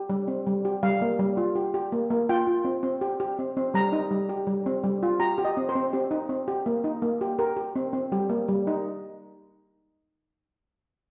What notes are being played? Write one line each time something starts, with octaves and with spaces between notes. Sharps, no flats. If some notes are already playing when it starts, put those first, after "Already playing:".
Already playing: G4
G3
C4
G3
G4
G3 F5
A#3
G3
F4
G4
G4
A#3
A#3
F4 G5
F4
C4
C4
G4
G4
C4
C4
G3 A#5
D#4
G3
G4
G3
C4
G3
F4
G4 A#5
G4
D#5
C4
C5
C4
C4 G4
D#4
C4
G4
A#3
D#4
A#3
G4
G4 A#4
G4
C4
C4
G3 G4
A#3
G3
D#4